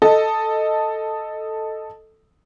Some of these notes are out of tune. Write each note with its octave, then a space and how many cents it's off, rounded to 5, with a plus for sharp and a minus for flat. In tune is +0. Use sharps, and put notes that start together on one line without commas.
A4 +0 D#5 +0